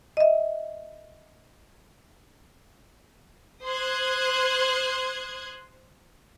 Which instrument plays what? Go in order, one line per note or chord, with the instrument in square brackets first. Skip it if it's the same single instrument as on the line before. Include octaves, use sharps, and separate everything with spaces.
[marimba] D#5 E5
[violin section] C5 C6 D#6 F#6 G#6